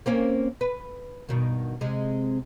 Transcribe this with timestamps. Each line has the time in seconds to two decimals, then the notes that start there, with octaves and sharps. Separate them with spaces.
0.06 A#3 C4 C#4
0.61 B4
1.29 G2 B2 D#3
1.81 C3 G#3